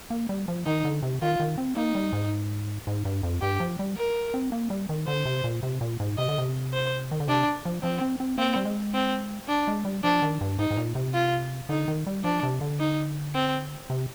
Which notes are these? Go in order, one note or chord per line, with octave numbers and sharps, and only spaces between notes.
A#3
G3
F3
D#3 D#4
D3
C3
D#3 F4
D#3
C4
A#3 D#4
G3
G#2
G#2
G2
F2
G2 G4
F3
G3
A#4
C4
A#3
G3
D#3
D3 C5
C3
A#2
C3
A#2
G#2
C3 D#5
D3
C3
C5
D#3
D3
C3 D4
F3
F3 C4
C4
C4
A#3 C4
G3
G#3
C4
D4
G#3
G3
F3 D4
D#3
G2
G#2 D#4
G#2
A#2
C3
F4
D3 D#4
D#3
G3
F3 D4
C3
D3
D#4
C4
C3